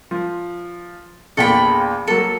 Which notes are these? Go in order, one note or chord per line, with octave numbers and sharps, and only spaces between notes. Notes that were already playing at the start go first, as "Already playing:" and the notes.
F3
A#1 E2 A#2 A4 G5 B5
F#3 A#3 A4